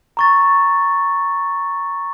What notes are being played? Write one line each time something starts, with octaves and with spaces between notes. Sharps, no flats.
A#5 C#6 A6